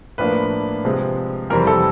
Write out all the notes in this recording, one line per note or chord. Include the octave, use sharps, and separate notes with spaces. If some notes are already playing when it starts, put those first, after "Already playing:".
A2 F3 A#3 D4 B4
C3 F3 G#3
F2 C3 E3 G3 C4 A#4
A4